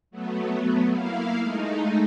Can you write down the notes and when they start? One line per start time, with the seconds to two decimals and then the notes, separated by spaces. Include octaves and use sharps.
0.11 F#3 A3 B3
0.90 A#3 E4 F5
1.41 G#3 A3 D#4